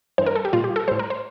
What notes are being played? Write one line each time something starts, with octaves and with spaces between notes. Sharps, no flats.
G2 E3 G3 C5
A#4
A4
G4
A#2 G3 F4
G4
A4
A2 G3 C5
A#4
C5